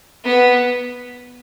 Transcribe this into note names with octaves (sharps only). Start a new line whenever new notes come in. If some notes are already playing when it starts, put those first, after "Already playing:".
B3